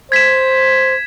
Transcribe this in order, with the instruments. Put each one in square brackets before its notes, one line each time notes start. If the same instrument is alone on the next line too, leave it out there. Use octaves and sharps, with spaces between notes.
[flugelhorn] C5 [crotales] G#6 B6 E7